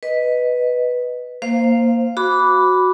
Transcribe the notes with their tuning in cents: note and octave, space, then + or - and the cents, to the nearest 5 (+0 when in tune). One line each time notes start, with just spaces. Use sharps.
B4 +0 D#5 +0
A#3 +0 C5 +0 F5 -10
F#4 +0 B5 +0 D6 -15